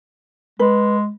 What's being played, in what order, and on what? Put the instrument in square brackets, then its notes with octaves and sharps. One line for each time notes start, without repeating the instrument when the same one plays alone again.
[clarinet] G#3 [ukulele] B4